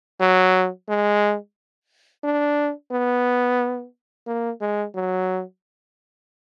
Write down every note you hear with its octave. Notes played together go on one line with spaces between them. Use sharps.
F#3
G#3
D4
B3
A#3
G#3
F#3